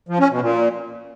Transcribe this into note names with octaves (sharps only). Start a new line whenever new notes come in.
F3
C#4
B2
A#2